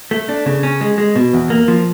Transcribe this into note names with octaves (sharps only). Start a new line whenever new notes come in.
A3
D4
C#3
C#4
G#3
G#3
B2
E2
A#3
F3